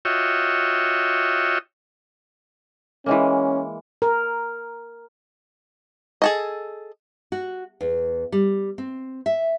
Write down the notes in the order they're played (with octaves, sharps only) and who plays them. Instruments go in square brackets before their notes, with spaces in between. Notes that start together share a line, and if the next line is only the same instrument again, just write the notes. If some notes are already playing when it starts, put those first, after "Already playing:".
[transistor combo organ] F4 F#4 C#5 D#5 E5 G5
[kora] E3 G#3 A#3 [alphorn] C#4
[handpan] A#4
[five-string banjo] G#4 A4 D#5
[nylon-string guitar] F#4
E2
G3
C4
E5